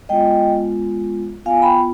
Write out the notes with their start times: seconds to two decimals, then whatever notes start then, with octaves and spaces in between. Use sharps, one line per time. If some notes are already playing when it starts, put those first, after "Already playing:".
0.09 G#3 B3 F4 D#5 G5
1.45 B3 F4 F5 G#5
1.62 G5 B5